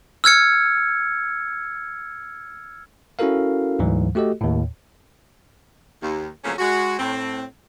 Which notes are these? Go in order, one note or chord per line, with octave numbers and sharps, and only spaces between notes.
E6 F6 G#6 C#7
C#4 E4 F#4 A4 A#4 F5
D2 G#2 E3 F#3
A3 F#4 G4 A4 D#5
D#2 A2
D#2
F2 C#3 F#3 A3 A#3 C#4
G#3 F#4
A2 C4